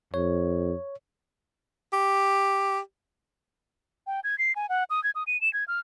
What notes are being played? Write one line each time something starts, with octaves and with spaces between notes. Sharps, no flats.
F2 C#5
G4
G5
G#6
C7
G#5
F#5
D#6
G#6
D#6
D#7
E7
G#6
F6